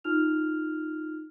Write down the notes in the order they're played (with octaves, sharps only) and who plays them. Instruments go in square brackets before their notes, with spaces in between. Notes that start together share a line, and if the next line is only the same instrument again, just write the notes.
[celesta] D#4 F4 F6 F7